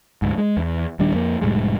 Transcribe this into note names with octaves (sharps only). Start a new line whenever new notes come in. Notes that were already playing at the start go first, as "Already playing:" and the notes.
D2 G#2
G#3
E2
D#1 D#3 G3 D4
F2 A#3
F1 A2 G3 G#3